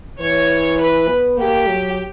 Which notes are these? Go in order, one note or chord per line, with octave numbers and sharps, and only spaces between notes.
E3 C#5
B4
B3
A#3 G4
F#3